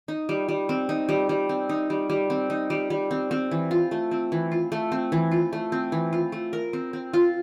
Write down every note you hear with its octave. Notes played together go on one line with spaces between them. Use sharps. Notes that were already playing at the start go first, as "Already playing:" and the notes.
D#4
G3
G3
C4
D#4
G3
G3
C4
D#4
G3
G3
C4
D#4
G3
G3
C4
C4
E3
F4
A3
C4
E3
F4
A3
C4
E3
F4
A3
C4
E3
F4
A3
A#4
C4
C4
F4